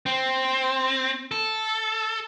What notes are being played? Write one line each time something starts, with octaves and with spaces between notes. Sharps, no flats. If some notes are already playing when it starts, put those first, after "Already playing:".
C4
A4